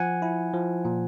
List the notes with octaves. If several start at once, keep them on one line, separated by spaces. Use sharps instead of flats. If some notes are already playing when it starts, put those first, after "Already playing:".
Already playing: F3 F#5 G#5
E4
F3
A#2